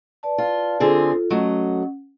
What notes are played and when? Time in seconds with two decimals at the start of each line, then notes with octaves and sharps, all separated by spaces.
0.23 B4 D5 A5
0.38 F4
0.80 D3 C4 F4 G#4 A4
1.30 F#3 A3 C#4 D#5 F#5